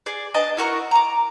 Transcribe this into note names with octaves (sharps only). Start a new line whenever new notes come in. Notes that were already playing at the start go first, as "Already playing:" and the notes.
G#4 D5
B3 D4 D#5 A5
E4 F#4 A#4 C#6
A#5 D6